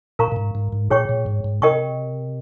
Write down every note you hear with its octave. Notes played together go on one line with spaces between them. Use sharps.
A#2 A#4 F5 A#5 C#6
A#2
G#2
G#2
G#2
A#2 G#4 C#5 G5 C#6
A#2
G#2
G#2
C3 A#4 D#5 G5 C#6